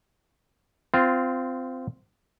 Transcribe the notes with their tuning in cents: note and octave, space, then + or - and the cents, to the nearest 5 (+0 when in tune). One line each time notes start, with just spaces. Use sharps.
C4 -15 F4 +0